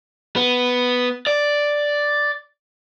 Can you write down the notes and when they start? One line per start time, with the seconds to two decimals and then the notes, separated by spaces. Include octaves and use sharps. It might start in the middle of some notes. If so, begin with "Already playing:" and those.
0.36 B3
1.27 D5